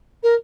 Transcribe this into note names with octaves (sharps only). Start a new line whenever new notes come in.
A#4